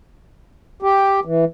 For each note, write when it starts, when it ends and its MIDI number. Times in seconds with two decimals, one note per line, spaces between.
0.82 1.20 67
1.25 1.45 52